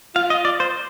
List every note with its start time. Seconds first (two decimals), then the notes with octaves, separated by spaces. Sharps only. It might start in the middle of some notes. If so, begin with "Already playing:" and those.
0.15 F4 F5
0.30 D#5
0.45 D5
0.60 C5